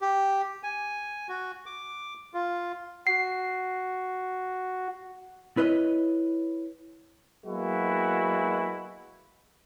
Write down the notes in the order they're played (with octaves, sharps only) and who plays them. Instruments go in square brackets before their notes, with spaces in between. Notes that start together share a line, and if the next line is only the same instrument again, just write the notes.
[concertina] G4
G#5
F#4
D6
F4
[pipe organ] F#4 [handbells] C7
[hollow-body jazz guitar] E4 B4 C#5 D#5
[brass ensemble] F#3 G#3 A#3 B3 E4 F#4